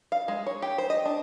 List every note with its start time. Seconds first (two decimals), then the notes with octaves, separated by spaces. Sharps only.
0.12 F5
0.28 G#3
0.46 C#5
0.62 G4
0.78 C5
0.90 D#5
1.05 D4